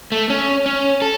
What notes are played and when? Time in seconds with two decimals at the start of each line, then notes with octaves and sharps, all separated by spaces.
0.12 A3
0.30 C#4
0.66 C#4
1.02 A4